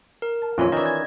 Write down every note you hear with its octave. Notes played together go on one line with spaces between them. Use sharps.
A#4
A5
F2 A#2 E3 C#4 F4 C#5
D#3 E3 D5 D#5
G#6